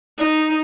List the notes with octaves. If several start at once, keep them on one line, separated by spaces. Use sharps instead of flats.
D#4